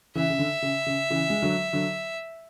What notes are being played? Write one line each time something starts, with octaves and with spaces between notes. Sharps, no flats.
C#3 E3 E5
C#3
D3
C#3
C#3
C#3 E3
G#3
D3 F#3
D3 F#3